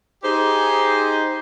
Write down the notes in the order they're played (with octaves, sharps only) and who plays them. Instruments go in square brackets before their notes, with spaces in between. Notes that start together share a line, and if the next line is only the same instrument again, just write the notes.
[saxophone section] D#4 G4 G#4 C5